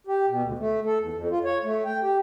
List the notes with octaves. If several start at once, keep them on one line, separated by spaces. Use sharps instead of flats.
G4
B2
D2
A3
A4
E2
F2
F4
C#5
A3
G5
G4